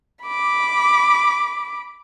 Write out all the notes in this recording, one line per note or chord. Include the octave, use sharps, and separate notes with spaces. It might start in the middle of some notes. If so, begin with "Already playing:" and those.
B5 D6